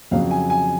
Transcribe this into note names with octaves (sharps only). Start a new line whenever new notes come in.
F2 C#3 F#3 F5
G#5
G#5